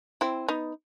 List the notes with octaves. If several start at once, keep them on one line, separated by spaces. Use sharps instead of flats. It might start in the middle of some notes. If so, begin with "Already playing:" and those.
C4 E4
B3 D#4